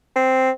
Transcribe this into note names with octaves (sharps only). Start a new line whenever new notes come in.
C4